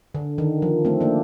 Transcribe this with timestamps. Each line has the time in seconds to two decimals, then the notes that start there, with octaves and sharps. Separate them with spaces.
0.15 D3
0.38 D#3
0.62 F3
0.85 A3 C4
1.00 A#3 D4